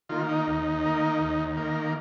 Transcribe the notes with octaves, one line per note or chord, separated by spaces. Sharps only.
D#3 A#3 F4
D#4
D#2
D#3 A#3
D#2
D#3 A#3